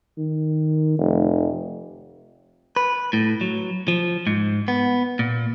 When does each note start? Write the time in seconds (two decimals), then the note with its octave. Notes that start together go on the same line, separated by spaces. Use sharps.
0.18 D#3
0.98 F1
2.76 B4
3.13 A2
3.41 F#3
3.88 F3
4.27 G#2
4.68 B3
5.19 A#2